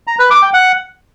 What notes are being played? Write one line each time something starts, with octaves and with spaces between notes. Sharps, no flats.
A#5
B4
D6
G5
F#5